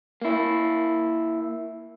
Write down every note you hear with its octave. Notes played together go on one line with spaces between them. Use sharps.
A#3 E4